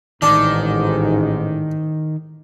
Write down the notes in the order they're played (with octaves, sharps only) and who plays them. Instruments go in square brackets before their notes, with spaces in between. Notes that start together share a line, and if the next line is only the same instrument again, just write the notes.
[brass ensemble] A1 G#2 [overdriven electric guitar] D#3 [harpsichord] D4